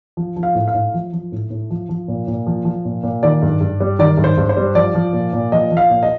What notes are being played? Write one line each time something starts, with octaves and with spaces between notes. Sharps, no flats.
F3
F3
F5
A2
F5
A2
F3
F3
A2
A2
F3
F3
A#2
A#2
F3
F3
A#2
A#2
D#3 D5
G2
G2
G3
D#3 D5
G2
C5
G2
C5
G3
F3 D5
F3
A#2
A#2
F3 D#5
F3
F5
A#2
D#5